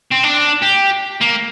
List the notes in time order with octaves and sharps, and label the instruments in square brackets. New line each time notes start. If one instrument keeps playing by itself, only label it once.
[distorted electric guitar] C4
D4
G4
A#3